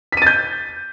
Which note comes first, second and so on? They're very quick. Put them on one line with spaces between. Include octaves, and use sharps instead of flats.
B6 D#7 A6 G6